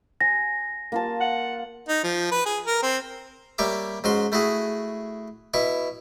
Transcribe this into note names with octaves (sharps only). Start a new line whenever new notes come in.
G#5 A#6
A#3 F4 A5
F#5
D#4
F3
B4
G#4
A#4
C4
G3 A#3 C#5 E5 D6
G#2 C#4 F#4 C6
A3 E4 F#4 G#4
B2 E4 C#6